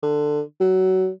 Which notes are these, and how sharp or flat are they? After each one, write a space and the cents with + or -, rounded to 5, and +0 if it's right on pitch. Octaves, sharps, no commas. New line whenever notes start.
D3 +15
F#3 +20